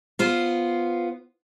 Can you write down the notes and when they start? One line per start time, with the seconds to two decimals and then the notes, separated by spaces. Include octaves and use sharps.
0.19 B3 F4 C5